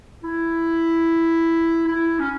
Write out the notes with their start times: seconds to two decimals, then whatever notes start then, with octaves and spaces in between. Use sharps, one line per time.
0.23 E4
1.87 E4
2.19 C#4